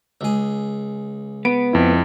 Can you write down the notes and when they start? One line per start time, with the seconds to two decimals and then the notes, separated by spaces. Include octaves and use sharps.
0.21 C#2 G#4
1.45 B3 D7
1.73 F2 E4